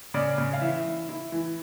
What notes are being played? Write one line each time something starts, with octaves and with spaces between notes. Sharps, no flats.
C#3 D5
C#3
F5
E3 E5
E3
E4
E3